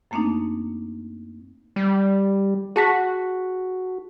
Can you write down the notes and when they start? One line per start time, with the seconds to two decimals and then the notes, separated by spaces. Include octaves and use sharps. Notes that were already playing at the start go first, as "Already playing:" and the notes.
0.11 F#2 A3 A#3 C4 D4 D#4
1.76 G3
2.76 F#4 G#4 A5 B6